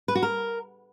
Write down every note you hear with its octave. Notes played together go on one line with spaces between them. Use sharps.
B4
F#4
A#4